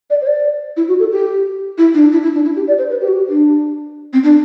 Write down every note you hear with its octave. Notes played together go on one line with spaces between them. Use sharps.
D5
C5
D5
E4
F#4
A4
G4
E4
D4
E4
E4
D4
E4
G4
D5
C5
B4
G4
F#4
G4
D4
C4
D4